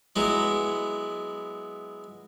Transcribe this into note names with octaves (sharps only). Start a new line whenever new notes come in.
F#3 G#3 B3 E4